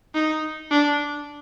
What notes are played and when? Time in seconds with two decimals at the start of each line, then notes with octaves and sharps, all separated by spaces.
0.14 D#4
0.70 D4